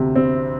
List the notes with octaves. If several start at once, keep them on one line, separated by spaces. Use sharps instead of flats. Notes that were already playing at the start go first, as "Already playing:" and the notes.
Already playing: D2 C3
C4